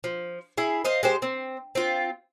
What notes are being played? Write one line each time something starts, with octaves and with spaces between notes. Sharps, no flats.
F3
E4 G#4
C5 D#5 F5
G#3 G4 C5
C4
C4 F4